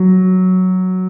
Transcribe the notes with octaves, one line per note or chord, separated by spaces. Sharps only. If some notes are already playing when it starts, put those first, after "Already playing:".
Already playing: F#3